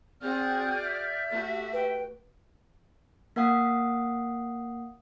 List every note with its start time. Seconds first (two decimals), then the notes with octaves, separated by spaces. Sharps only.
0.21 C4 F#4 G#4 D5 F#5 F6 G6
0.82 E5
1.31 A3 F#4 G4
1.73 B4 G5
3.36 A#3 A#4 F5 F#5 D#6